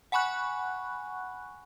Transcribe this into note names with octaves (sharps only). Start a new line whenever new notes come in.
F#5 G#5 B5 C#6 F#6